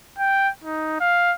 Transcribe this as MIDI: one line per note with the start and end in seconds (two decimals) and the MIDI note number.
0.19 0.50 79
0.64 0.99 63
1.00 1.34 77